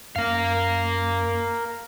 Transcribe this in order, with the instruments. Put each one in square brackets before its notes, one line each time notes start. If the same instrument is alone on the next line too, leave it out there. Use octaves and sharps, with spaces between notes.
[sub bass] F#2 [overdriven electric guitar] A#4 F5